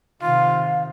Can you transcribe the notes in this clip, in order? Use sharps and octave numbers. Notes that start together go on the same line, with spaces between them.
C3 D#3 F4 F5